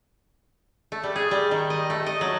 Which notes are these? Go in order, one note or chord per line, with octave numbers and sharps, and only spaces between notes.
A3
G3
G#4
G3
D#3
D#5
A3
D#5
F#3